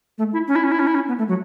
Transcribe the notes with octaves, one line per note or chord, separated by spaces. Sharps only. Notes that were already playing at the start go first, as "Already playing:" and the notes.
A3
E4
C#4
E4
C#4
E4
C#4
E4
C#4
B3
A3
F#3